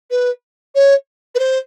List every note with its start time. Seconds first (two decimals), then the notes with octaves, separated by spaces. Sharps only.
0.10 B4
0.75 C#5
1.35 B4
1.39 C5